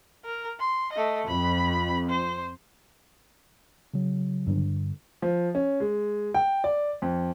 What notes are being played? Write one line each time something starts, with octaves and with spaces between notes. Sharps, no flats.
A#4
C6
A3 D#5
F2 B5
C5
C#3 F#3
G2 D3
F3
C#4
G#3
G5
D5
F2